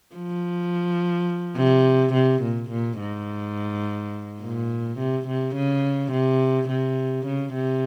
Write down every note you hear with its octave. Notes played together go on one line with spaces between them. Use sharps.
F3
C3
C3
A#2
A#2
G#2
A#2
C3
C3
C#3
C3
C3
C#3
C3